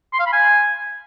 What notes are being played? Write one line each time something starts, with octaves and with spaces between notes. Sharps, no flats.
C6
F5
B5
G#5